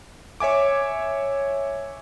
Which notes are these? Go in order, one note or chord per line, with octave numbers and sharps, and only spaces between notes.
C#5 E5 G#5 D6